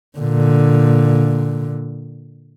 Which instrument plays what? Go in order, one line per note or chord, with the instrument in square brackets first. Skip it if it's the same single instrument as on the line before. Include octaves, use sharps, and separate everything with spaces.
[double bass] A#2 D3